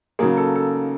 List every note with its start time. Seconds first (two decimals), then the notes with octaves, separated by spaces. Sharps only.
0.19 C#3 F#3 A#3 G#4
0.37 A4
0.55 A4